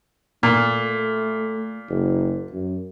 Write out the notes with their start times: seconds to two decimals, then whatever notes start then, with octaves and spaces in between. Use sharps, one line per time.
0.43 A#2 A3
1.90 F#1
2.53 F#2